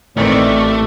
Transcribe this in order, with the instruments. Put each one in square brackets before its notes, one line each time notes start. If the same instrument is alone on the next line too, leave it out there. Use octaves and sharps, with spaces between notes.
[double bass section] A1 A2 [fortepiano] D#3 E3 C4 [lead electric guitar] A3 [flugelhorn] D5